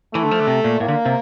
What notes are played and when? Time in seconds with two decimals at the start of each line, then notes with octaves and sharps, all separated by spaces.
0.14 E3 A3
0.23 D3
0.31 F3
0.40 D3
0.47 C3
0.64 A#2
0.80 A2 A#3
0.88 D3
1.06 C3